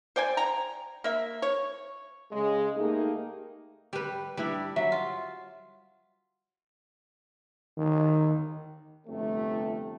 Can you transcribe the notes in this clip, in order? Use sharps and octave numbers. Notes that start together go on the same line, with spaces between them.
C5 D5 G5 G#5
G5 A#5
A#3 E5
C#5
C#3 G#3
A3 A#3 D#4 G4 G#4
G3 G4 B4
G3 D4 E4 B4
F#3 E5
F4
D#3
G1 F2 C3 A3